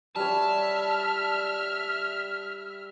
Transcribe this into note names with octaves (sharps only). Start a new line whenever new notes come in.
G3 C#5 E5 A5 F6